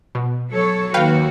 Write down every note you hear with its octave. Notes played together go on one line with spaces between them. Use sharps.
B2
F#3 A4 C#5
D#2 F#4 B4 F5 G5